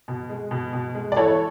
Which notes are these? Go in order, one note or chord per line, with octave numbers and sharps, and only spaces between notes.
B2
G#3
B2
B2
G#3
D5
E3 A4 C#5